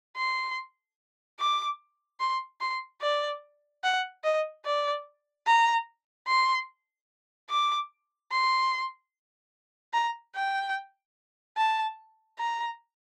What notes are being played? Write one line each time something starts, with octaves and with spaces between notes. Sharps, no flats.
C6
D6
C6
C6
D5
F#5
D#5
D5
A#5
C6
D6
C6
A#5
G5
A5
A#5